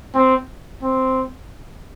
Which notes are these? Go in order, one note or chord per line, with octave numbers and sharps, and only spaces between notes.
C4
C4